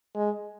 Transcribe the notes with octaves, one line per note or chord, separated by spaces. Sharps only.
G#3